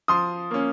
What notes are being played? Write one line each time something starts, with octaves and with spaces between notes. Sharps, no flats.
F3 C6 D#6
A#3 C#4